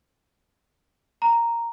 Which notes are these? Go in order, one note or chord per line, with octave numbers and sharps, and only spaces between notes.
A#5